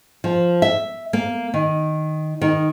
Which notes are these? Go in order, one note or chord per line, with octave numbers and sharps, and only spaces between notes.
F3
E5
A#3
D#3
D#3